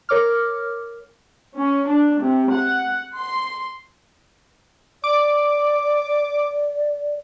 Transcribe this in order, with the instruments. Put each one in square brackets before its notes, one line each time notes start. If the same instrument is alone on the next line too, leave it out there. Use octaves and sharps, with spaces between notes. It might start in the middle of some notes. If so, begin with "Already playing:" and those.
[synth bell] A#4 C#5 D6 F6
[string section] C#4
D4
C3
F#5
C6
[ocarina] D5 [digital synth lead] D6